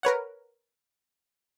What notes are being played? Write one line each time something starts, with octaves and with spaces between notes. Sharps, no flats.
A#4 B4 C#5 F#5